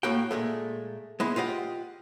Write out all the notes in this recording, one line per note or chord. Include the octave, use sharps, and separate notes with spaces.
A2 A#3 F#4 G5
A#2 G#3 A3
G#3 B3 E4
F4 G4 D#5 F#5